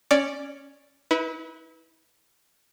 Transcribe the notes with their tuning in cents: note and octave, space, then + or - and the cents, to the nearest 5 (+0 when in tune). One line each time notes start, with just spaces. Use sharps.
C#4 +0 D5 +0
E4 -35 B4 +0